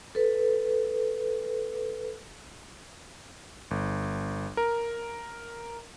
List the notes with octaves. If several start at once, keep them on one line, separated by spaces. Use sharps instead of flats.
A4 B4
G1
A#4